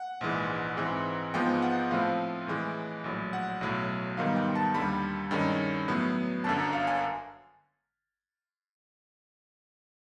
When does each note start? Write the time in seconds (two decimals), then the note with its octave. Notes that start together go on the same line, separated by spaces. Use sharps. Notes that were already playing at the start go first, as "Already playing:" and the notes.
Already playing: F#5
0.21 A#1 G#2 E3 G#3
0.77 G#2 E3 G#3 C4
1.34 G#2 F3 G#3 B3 G5
1.62 F#5
1.91 A2 F3 A3 C4 F5
2.47 A2 E3 G#3
3.04 A#1 A2 F#3
3.33 F#5
3.61 B1 A2 F#3
4.17 G#2 D#3 G3 B3 F5
4.36 G5
4.55 A5
4.74 D#2 D3 G3 B5
5.31 G2 D#3 G#3 C#4
5.88 A2 F#3 B3
6.44 G1 F#2 D3 A5
6.59 A#5
6.73 F5
6.87 G#5